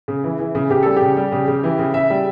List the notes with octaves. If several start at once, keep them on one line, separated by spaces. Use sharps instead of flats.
C#3
E3
E3
C#3
C#3 G4
G3 A4
G4
C#3
G3
C#3
C#3
E3
C#3
C#3 E5
G3